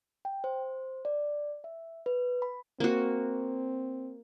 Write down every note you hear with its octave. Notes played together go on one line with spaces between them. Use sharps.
G5
C5
D5
E5
B4
B5
A#3 C4 F#4